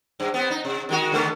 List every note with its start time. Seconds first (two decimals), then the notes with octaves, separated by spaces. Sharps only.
0.20 G2
0.34 B3 C4
0.50 D#4
0.65 C3
0.89 D#3 G#3 F#4
1.12 D3 A3 B3